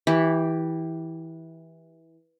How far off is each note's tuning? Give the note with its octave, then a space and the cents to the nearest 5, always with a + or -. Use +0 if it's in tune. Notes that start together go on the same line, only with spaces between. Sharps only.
E3 -15 G4 +0